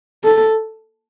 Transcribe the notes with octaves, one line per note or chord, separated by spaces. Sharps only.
A4